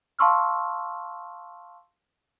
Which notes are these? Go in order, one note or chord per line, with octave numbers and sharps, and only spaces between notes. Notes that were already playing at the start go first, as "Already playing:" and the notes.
F5 A5 C6 C#6 E6 F6